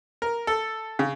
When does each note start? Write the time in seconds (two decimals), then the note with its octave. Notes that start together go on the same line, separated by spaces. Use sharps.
0.22 A#4
0.47 A4
0.99 C#3